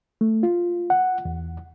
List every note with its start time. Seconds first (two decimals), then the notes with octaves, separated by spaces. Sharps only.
0.21 A3
0.43 F4
0.90 F#5
1.25 E2